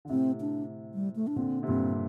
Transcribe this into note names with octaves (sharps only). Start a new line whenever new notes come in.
D3
A2 C3 C4
D4
G3
A3
D4
A#2 D3 C4
C3
G2 A#2 C4